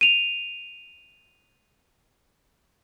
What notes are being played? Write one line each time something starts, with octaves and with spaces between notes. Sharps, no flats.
D#7 F7